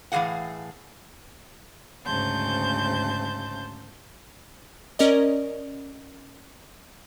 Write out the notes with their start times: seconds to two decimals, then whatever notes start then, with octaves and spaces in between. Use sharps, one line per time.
0.12 A2 E3 F3 G#4 F5 F#5
2.05 D2 G#2 C#3 A5 C6 G6
4.99 C#4 A#4 D5 D#5